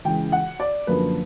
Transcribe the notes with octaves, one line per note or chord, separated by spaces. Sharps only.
C#2 C#3 E3 G5
F#5
D5
F#2 D3 F3 A#3 B4